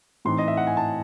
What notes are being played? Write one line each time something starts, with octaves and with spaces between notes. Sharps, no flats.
A2 E3 C4 D#4 C6
D#5
E5
F#5
G#5
A5